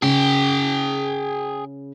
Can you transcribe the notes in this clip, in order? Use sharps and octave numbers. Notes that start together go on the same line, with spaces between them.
C#3 G#4 G5